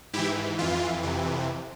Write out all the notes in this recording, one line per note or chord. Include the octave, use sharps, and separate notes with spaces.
G#2 E3 E4 G4
F2 E3 F4
F2 C3 E3